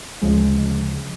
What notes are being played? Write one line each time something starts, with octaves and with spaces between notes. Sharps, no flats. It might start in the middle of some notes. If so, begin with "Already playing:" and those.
D2 C#3 F3 G#3